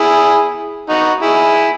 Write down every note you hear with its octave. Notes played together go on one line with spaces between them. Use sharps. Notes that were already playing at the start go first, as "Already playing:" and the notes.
Already playing: E4 G#4
D#4 F#4
E4 G#4